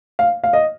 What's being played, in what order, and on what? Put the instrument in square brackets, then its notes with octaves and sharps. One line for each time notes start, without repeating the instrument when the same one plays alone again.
[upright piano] F5
F5
D#5